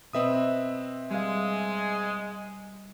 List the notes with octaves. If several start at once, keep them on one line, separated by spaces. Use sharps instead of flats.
B2 C4 B4 D#5 E5 D#6
G3 G#3 F5